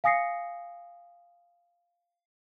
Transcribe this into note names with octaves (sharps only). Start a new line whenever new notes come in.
F5 G#5 D#6 A#6 C7 C#7